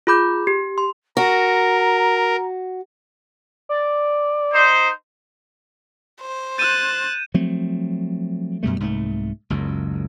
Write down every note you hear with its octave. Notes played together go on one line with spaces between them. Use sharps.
F4 G#4 B5 D6 G6
G4
C6
F#4 A#4 A#5
D5
D#4 C5
C5
F#6 G6 A6 D#7 E7
F3 F#3 A3 C4
F#2 B2 G3 A3
C2 G#2 G#3 A3
F#1 C#2 F#2